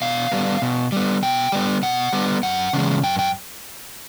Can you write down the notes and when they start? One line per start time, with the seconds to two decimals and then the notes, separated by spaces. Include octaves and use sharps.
0.02 B2 F5
0.32 G3 B3
0.62 B2
0.92 G3 B3
1.23 B2 G5
1.52 G3 B3
1.83 B2 F#5
2.13 G3 B3
2.43 F#2 F#5
2.73 C#3 E3 G#3
3.03 F#2 G5
3.19 G5